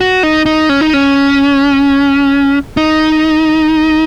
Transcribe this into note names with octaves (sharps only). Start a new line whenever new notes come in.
F#4
D#4
D#4
C#4
D#4
C#4
D#4